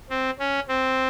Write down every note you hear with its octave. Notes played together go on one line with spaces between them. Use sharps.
C4
C#4
C4